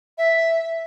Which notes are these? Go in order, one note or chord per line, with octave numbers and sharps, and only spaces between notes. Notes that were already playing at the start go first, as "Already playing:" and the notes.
E5